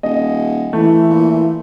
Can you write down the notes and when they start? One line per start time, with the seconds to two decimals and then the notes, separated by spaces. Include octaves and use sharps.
0.03 D#1 D#5
0.73 E3 A3
1.10 A#2